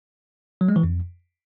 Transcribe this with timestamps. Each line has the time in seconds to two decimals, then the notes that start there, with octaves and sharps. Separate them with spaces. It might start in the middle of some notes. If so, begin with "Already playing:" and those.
0.61 F#3
0.68 G#3
0.76 E3
0.83 F2